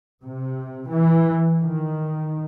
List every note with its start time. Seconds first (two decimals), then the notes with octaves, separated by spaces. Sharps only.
0.23 C3
0.88 E3
1.62 D#3